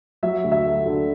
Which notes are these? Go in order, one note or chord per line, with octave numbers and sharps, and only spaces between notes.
F#3 E5
D2
E5
A3
D3